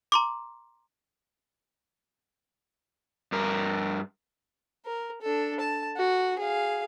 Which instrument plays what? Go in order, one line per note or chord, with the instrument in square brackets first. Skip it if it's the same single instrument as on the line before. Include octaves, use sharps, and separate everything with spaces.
[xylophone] A#5 C6 D6
[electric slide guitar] G2 A#4
[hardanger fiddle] A#4
D4 A4
A5
F#4
G#4 F5